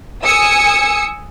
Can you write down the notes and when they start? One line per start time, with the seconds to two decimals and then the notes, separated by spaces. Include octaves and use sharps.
0.24 G#5 D#6 E6 C#7